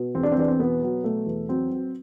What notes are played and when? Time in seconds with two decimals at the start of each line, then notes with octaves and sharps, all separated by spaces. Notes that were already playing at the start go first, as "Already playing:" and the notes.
Already playing: B2
0.15 E2 C4
0.23 D4
0.32 C4
0.37 E2 D4
0.48 C4
0.59 B2 B3
0.82 F#3
1.04 B2 A3
1.27 E2
1.49 F#3 C4
1.71 F#3